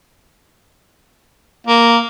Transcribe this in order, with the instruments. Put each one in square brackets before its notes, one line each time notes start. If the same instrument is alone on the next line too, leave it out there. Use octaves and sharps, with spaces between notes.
[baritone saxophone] A#3